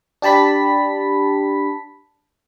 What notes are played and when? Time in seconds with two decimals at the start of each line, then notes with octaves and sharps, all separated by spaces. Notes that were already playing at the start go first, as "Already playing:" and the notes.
0.22 D4 G4 A5 B5 B6